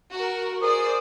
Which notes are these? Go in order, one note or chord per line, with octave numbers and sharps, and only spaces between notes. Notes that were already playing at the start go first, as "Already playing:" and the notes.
F#4 A#4
G#4 A#4 C5 D5 D#6